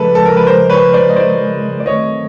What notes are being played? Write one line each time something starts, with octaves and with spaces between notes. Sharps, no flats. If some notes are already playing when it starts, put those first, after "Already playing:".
Already playing: C#3 F3 G#3 A4 B4
A4
A#4
B4
A#4 C5
B4 C#5
C5 D5
D#5
C5 D5
D5
D#3 F#3 A3 C4 C#5 D#5